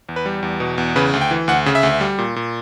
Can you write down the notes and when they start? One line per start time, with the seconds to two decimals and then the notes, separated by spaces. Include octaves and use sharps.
0.09 E2
0.16 B4
0.26 G3
0.43 E2
0.60 B2
0.78 E2
0.96 C#3 B4
1.13 D2
1.21 G5
1.31 E3
1.48 D2 F#5
1.66 C#3
1.75 E5
1.83 D2
2.01 G3
2.18 A#2
2.36 A#2